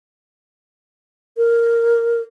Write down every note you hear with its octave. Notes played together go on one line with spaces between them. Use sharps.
A#4